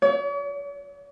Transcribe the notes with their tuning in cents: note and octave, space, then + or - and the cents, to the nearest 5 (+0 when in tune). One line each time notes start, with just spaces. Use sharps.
C#5 +45